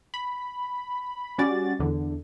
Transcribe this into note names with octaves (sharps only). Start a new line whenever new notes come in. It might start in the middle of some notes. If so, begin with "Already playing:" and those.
B5
G3 C#4 F#4 D5 A6
E2 D3